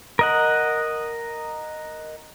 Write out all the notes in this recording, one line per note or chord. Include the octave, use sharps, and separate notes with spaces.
A#4 D#5 F#5